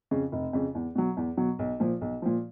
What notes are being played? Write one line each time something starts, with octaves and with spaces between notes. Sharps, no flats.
F2 C#3
F1
F2 C#3
E2
B2 F#3
E2
B2 F#3
B1
A#2 F3
B1
A#2 F3